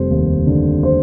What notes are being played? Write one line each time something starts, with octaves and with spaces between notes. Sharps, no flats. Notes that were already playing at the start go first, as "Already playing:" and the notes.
Already playing: F1 G3 C5
D#2
D3
C5